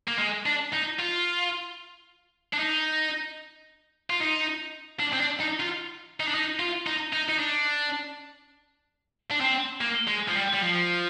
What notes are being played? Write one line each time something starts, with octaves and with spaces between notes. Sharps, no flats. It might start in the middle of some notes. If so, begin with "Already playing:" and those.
A#3
G#3
D4
D#4
F4
D4
D#4
F4
D#4
D4
C4
D4
D#4
F4
D#4
D4
D#4
F4
D#4
D#4
D#4
D4
D4
C4
A#3
G#3
F3
G3
G3
F3